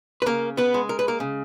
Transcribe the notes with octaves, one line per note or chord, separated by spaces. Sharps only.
B4
C#3 A#3 A#4
B3 B4
G#3
A#4
B4
A#3 A#4
C#3